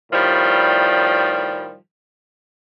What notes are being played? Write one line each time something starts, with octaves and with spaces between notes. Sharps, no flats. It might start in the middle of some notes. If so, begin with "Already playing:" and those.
A2 D#3 F3 G3